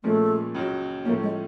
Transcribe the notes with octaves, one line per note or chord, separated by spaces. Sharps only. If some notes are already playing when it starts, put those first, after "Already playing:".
A#2 F3 G#3 A3 C#4
C#2 C#3 F#3
A2 F3 A3 A#3 C#4
G#3